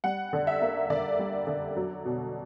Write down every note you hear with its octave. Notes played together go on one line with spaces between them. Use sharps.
G3 F#5
D3
E5
A#3
D3 D5
G3
D3
F#3
B2